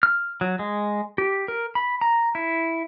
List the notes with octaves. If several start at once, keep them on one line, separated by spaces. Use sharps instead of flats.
F6
F#3
G#3
G4
A#4
B5
A#5
E4